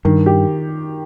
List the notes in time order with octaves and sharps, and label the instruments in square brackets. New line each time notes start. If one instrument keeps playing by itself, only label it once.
[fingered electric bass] G2 [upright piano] D#3
[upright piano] G4